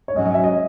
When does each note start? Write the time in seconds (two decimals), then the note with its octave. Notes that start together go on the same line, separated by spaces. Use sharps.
0.08 C#5
0.15 G#2 F#3 C#4 D#5
0.26 D#5
0.34 E5
0.44 D#5